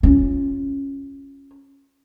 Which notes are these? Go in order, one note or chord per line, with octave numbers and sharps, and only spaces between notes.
C#4 F4